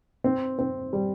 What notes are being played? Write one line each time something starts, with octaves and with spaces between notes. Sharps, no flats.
C4
C4
G3